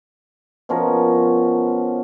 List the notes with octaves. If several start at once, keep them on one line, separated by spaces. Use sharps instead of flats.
B2 F3 C#4 A#4